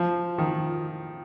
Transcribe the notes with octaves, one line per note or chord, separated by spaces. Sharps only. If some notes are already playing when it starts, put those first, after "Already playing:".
Already playing: F3
D#3